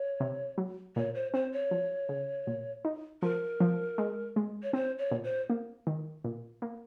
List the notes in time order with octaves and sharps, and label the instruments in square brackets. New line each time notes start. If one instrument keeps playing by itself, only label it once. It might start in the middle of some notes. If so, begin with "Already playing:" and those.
Already playing: [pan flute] C#5
[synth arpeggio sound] C3
F#3
[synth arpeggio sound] A#2 [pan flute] C#5
[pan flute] C5
[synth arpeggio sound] C4 [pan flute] C5
[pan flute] C#5
[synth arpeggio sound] F3
C#3
A#2
D#4
[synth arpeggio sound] F3 [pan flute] A#4
[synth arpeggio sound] F3
G#3
G#3
[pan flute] C#5
[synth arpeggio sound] C4 [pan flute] C5
[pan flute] C#5
[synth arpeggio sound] A#2
[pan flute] C5
[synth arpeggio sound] A#3
D#3
A#2
A#3